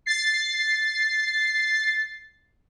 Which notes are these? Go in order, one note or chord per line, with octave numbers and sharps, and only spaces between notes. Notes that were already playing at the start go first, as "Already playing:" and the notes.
A6 C7